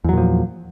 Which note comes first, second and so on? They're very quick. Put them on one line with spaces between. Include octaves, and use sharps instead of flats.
E2 F#3 A#2 F3